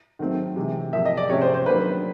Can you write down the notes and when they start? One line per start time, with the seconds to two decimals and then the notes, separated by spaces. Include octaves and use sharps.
0.19 D#3 F#3 A3 C4
0.56 C3 E3 G#3
0.93 C3 F3 A#3 E5
1.05 D#5
1.17 D5
1.30 C3 F3 A3 C#4 C#5
1.41 C5
1.54 C5
1.66 D#3 F#3 A#3 D4 B4